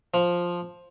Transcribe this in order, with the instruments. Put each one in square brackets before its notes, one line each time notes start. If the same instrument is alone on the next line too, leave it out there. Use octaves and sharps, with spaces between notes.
[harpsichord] F3